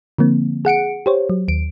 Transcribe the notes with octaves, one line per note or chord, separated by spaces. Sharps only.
D3 F3 A#3 C4
G#4 F#5 C#7 D7
G4 C5 C#5
F#3
D#2 D7